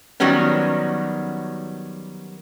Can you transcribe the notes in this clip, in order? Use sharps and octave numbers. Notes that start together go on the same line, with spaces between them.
D#3 F#3 G3 B3 C#4